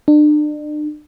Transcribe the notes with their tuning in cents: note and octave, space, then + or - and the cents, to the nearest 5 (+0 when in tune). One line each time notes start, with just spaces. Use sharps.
D4 +35